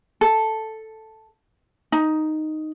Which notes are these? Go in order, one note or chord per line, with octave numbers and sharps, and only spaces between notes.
A4
D#4